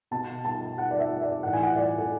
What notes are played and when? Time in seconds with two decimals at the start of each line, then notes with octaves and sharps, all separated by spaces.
0.11 B2 A5
0.45 A5
0.78 F#5
0.91 D5
0.99 E5
1.22 D5
1.43 A2 E3 F#5
1.53 G#5
1.63 F#5
1.76 D5
1.98 A4